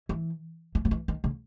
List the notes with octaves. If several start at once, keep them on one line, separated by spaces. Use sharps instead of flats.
E3
E3
F#3
E3
D#3
C#3